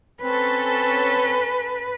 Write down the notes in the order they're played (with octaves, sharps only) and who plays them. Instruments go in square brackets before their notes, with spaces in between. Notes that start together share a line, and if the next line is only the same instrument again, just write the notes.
[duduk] C4 [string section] C#4 A4 [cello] B4